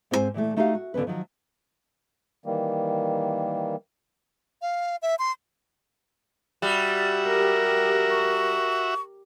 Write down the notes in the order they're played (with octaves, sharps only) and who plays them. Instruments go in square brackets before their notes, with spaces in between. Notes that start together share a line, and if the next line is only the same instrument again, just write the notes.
[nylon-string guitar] G#2 C4 D#4 F4 C5 G#5
A#2 E3 G#3 A3
A3 D#4 F#4 G4 D#5 F5
F#4
F2 D3 B3 C#4 B4
D#3 F3 F#3
[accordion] D#3 E3 G3 A#3
[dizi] F5
E5
C6
[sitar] G3 [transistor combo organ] F#4 E5
[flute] G4 [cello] A#4
[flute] C#6